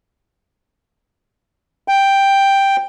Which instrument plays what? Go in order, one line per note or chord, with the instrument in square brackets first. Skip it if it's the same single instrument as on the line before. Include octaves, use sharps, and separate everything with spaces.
[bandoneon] G5